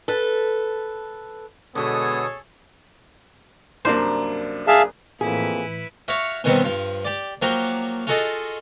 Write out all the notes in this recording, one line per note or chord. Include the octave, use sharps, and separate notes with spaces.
A4 B4
B2 D3 G#3 B3 G#4 A4 C#5 D#6
C2 F#2 A#3 D4 C5
G#4 E5 F5 A5
F2 A2 E3 A#3 E4 G#4 B4
F#4 C#5 E5 F5
B2 D#3 F#3 G3 B3 C4
G2 F3
G4 D5
F3 F#3 A#3 F#4 G4
F4 F#4 G#4 A4 D#5